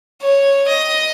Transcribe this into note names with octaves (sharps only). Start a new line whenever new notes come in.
C#5
D#5